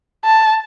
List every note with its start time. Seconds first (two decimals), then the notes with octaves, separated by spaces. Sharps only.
0.25 A5